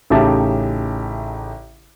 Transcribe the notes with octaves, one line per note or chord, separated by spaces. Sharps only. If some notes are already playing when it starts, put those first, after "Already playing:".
A1 C#3 D#4 G4 E5 A5